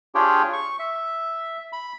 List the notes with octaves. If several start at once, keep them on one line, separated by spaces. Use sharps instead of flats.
D4 F4 G4 G#4 C#5 G5
C#6
E5
B5